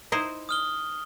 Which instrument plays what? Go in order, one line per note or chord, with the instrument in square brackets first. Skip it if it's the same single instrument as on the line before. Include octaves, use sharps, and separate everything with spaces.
[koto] D#4 E4 C5
[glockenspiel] D#6 F6 G7